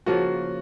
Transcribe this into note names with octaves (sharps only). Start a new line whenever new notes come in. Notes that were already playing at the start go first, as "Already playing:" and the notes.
C#3 F3 A#3 F4 F#4